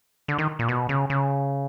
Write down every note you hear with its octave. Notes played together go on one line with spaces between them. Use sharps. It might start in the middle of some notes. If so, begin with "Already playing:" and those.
D3
D#3
A#2
B2
C#3
C#3